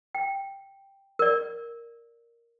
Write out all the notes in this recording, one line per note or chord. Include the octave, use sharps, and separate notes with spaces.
G5
A#4 D5